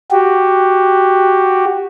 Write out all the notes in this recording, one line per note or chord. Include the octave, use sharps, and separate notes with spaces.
F#4 G4